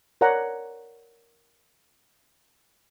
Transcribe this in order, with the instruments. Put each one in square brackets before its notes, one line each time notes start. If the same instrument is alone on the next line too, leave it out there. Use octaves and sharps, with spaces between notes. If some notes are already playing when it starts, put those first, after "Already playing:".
[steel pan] A#4 C#5 D5 F#5 A#5